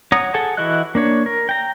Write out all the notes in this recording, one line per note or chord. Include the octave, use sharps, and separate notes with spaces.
C#5 F#5 A#5 D#6
G#4 A4 F#5 G#5 A5
E3 E4 F#4 D#5 F#6
A#3 D4 C#5
A#4
G5 A#5